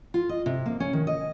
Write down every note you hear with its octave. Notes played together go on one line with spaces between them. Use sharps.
F4
D#5
C3
A#3
C#4
D#3
D#5